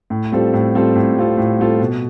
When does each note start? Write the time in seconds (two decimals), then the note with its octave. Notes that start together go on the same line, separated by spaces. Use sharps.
0.10 A2
0.32 G3 C4 F4 A4
0.53 A2
0.75 G3 C4 F4 A4
0.96 A2
1.16 G3 C4 F4 A4
1.37 A2
1.58 G3 C4 F4 A4
1.80 B2